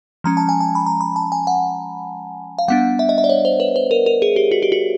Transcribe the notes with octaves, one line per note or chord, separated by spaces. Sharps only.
F3 G#3 C#4 A#5
A5
G#5
A5
B5
A#5
B5
A5
G#5
F#5
F5
G3 B3 D4 F#5
E5
D#5
E5
D5
C#5
C5
B4
C5
A#4
A#4
G#4
G4
F#4
G4
F#4